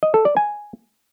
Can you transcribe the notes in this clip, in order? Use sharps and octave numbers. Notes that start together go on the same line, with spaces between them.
D#5
A4
D5
G#5